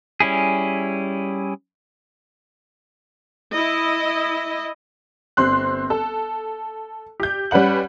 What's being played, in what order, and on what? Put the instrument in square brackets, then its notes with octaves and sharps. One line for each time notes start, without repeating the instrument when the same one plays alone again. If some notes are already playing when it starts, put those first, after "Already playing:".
[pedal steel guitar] G3 C#4 E4 G#4
[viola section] E4 D#5
[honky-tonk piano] G1 C4 C6 F#6
A4
G4 G6
G3 C#4 B4 F#5 F#7